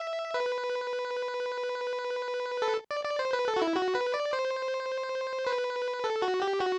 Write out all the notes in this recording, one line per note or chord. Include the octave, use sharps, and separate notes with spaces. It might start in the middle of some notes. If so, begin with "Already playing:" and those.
Already playing: E5
B4
A4
D5
D5
C5
B4
A4
F#4
E4
F#4
B4
D5
C5
B4
A4
F#4
G4
F#4